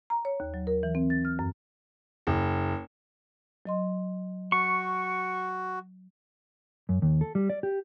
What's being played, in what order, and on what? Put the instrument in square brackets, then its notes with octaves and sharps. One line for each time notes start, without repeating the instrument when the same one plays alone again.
[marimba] A#5
C#5
D#2
F#3
A#4
E3
C4
A6
F6
F#2
[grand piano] F#1
[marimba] F#3 D#5 C6
[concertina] F#4 [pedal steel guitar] C#6
[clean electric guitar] F#2
D#2
A4
G3
D5
G4